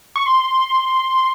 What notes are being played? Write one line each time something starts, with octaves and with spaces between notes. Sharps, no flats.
C#6
C6